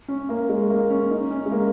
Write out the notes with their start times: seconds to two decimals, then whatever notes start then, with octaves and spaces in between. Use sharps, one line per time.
0.08 C#4
0.29 A#3
0.49 G#3
0.70 A#3
0.90 C#4
1.10 D#4
1.31 C#4
1.46 G#3
1.51 A#3